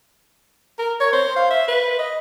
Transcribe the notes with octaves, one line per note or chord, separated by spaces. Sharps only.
A#4
C#5
C5
F5
E5
B4
D#5